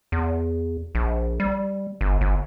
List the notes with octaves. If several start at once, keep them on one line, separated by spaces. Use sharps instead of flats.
E2
A#1
G3
G1
G1